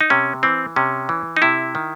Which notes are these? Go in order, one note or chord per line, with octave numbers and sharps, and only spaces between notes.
D#4
C3 C#4
E3 C4
C3 C#4
E3
D#4
C3 E4
D#3